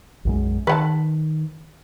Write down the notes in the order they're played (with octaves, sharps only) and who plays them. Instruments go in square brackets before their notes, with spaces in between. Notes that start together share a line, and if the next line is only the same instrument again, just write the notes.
[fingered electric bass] B1 F#2 G#3
[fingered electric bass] D#3 [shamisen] B4 F#5 A5